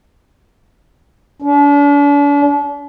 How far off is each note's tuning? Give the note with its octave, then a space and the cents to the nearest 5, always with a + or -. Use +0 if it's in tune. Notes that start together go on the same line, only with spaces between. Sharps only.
D4 -40